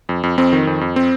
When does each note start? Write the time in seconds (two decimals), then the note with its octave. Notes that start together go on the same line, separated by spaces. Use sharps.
0.09 F2
0.23 F2
0.38 F2 C4
0.53 D#3
0.67 F2
0.81 F2
0.96 C4